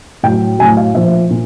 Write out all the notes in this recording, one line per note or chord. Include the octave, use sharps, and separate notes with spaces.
A2 F#3 G5
A2 F#3 G#5
F5
A#2 F3 E5
A#2